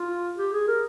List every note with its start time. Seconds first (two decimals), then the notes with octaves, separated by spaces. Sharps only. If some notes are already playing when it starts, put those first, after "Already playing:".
Already playing: F4
0.38 G4
0.53 G#4
0.68 A#4